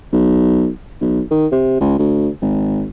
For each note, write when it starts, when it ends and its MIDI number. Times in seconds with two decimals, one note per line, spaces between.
0.13 0.69 35
1.01 1.22 35
1.31 1.47 51
1.52 1.76 48
1.81 1.94 37
1.99 2.29 38
2.42 2.87 32